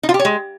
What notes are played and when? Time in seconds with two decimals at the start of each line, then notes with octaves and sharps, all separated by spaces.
0.03 D#4
0.09 F4
0.14 G4
0.19 C#5
0.25 G#3